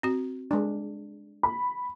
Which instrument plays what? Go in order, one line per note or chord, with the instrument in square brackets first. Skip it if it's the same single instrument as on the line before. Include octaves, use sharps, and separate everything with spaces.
[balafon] C4 F#4
[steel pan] G#3 D4
[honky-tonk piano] B5